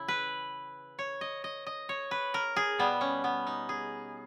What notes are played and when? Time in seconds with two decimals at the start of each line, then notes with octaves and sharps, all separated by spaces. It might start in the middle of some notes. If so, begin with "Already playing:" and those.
Already playing: C#3 E3 E4
0.08 B4
0.99 C#5
1.21 D#5
1.44 D#5
1.67 D#5
1.89 C#5
2.11 B4
2.34 A#4
2.56 G#4
2.79 B2 G3 B3
3.01 C#4
3.24 B3
3.47 D#4
3.69 G#4